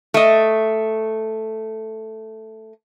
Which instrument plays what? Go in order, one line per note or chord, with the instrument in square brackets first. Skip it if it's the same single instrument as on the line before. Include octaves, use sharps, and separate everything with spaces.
[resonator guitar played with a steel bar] A3 D#5